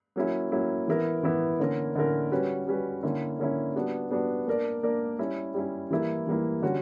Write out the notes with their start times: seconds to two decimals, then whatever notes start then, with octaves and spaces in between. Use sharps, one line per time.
0.16 F#3 A#3 C#4 E4
0.51 F#3 A#3 C#4 E4
0.88 E3 B3 E4 A#4
1.23 E3 B3 E4 A#4
1.60 D3 A#3 C#4 E4 A#4
1.95 D3 A#3 C#4 E4 A#4
2.32 G3 C#4 F#4 B4
2.67 G3 C#4 F#4 B4
3.03 D3 A#3 C#4 E4
3.39 D3 A#3 C#4 E4
3.76 G3 B3 D4 F#4
4.11 G3 B3 D4 F#4
4.47 A#3 D4 A#4 D5
4.83 A#3 D4 A#4 D5
5.18 G3 C#4 E4
5.54 G3 C#4 E4
5.90 E3 G3 A#3 E4
6.27 E3 G3 A#3 E4
6.62 D3 G3 C#4 F#4